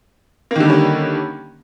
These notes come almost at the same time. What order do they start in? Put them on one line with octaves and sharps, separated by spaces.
A#3 D#3 D3 G3 C#4